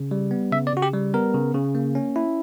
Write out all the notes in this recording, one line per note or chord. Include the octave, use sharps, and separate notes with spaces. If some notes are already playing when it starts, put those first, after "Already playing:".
Already playing: C#3
G3
B3
C#3 E5
D5
C#3 F#4
G4
G3
B3 A#4
C#3
C#3
A#3
C#4
E4